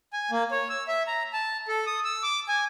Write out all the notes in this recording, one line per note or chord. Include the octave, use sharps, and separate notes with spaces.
G#5
A#3
C#5
E6
E5
A#5
A5
A4
D#6
E6
D6
G#5